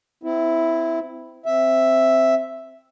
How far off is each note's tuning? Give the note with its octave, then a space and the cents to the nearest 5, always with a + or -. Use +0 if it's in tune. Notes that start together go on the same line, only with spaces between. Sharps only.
C4 -30 E4 +0
C4 +0 E5 +0